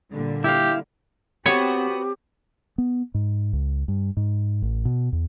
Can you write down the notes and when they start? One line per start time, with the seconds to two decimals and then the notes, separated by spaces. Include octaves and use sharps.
0.11 A#2 D3 G3
0.44 E4 G4 F5
1.46 B3 C4 F#4 G4 C#5
2.78 B3
3.14 G#2
3.53 C#2
3.88 G2
4.17 G#2
4.62 A1
4.85 B2
5.12 E2